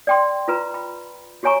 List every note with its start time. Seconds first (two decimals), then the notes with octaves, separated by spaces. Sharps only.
0.07 D5 G5 C6
0.48 F4 B4 A#5
0.74 B5
1.43 F#4 G4 C#5 G#5 A#5 C#6